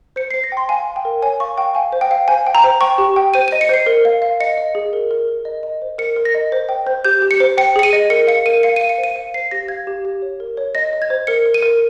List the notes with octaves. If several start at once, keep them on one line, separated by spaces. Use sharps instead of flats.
C5 C#7
C5 C7
A#6
G5 C6
F5 G#5
F5
G5
A#4
C#5 G#5
F5 C#6
F5 G5
F5 G#5
C5
G5
F5
C5 G#5
G5
A#5
C5
G5 C#6
G4
G5
C5 D#7
D#5 D#7
C#7
C5 C7
A#4
F5
F5
D#5 C#7
D#5
G#4
A#4
A#4
A#4
D#5
D#5
C5
A#4 C#7
A#4
A#6
D#5
C5
G5
C5
G4 G6
G4
C#7
C5
G5 C#7
G#4 C#7
D#7
D#5
A#4 C#7
F5 C#7
A#4 D#7
F5 C#7
F5 D#7
C#7
C5
D#7
F5
C5 C7
G4 A#6
F5 G#6
G4
G4
C#5
A#4
C#5
D#5 A#6
D#5
G#6
C5
A#4 C#7
A#4
D#7
A#4